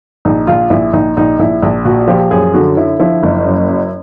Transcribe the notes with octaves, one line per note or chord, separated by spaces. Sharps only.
A#1 D#4
A#1 F4
A#1 E4
A#1 D#4
A#1 D#4
A#1 E4
A#1
A#2 F#4
F3 G4
F#2 G#4
D3 F#4
D3 E4
F3 E4
F#1
F#2
F#2